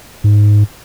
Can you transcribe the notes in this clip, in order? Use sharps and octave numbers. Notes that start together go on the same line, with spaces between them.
G#2